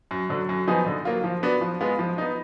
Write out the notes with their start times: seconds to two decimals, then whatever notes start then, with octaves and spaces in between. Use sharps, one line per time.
0.11 F#2
0.30 D3 F#3
0.49 F#2
0.67 F3 B3 D#4 G#4
0.86 D3
1.05 F#3 A#3 F4
1.24 F3
1.43 B3 D4 F#4
1.61 F3
1.81 G#3 B3 F4
1.99 F3
2.18 B3 D#4